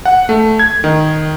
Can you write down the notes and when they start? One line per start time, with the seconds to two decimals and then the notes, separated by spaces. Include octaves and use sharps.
0.05 F#5
0.29 A3
0.59 G#6
0.84 D#3